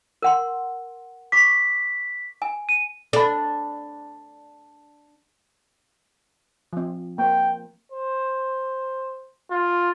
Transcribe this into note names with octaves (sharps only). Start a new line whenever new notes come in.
A#4 F#5 C6
C#6 D6 B6
G#5
D#7
D4 A4 B5
F3 C4
A#3 C5 G5
C5
F4